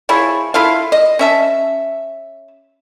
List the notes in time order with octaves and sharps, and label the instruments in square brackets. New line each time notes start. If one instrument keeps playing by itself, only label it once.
[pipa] F3 E4 G#4 C#5
E4 F4 A4 F5
D#5
C#4 E5 A5